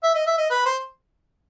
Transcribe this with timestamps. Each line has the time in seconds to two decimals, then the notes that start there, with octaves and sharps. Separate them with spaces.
0.03 E5
0.15 D#5
0.27 E5
0.38 D#5
0.50 B4
0.66 C5